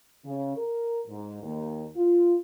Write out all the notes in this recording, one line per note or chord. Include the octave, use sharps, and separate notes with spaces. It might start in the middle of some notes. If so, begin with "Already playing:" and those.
C#3
A#4
G#2
D#2
F4